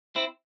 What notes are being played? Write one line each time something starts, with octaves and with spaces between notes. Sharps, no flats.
C4 E4